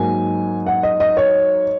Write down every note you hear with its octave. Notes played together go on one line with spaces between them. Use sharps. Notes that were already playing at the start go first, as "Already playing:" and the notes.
Already playing: G#2 F#3 A#3 D#4 G#5
F#5
D#5
D#5
C#5